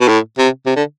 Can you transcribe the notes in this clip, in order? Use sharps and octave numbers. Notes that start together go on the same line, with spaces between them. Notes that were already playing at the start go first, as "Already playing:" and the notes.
B2
A2
C3
C3
D3